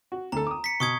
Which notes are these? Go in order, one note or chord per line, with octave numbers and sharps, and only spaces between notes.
F#4
D2 A4 A#5
D6 D#6
B6 C#7
B2 C#6 D#6 G#6